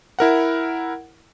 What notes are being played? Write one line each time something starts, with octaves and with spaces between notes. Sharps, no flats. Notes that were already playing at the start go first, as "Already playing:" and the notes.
E4 A#4 F#5